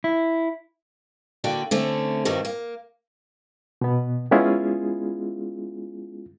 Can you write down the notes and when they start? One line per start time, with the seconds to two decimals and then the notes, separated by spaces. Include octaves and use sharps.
0.04 E4
1.44 D3 A#3 F#4 D5 G5
1.71 D3 A3 C4 C#4
2.25 G2 C3 D#3 G3 F#4
2.45 A#3
3.81 B2 B3
4.31 G#3 B3 C#4 E4 F4 G#4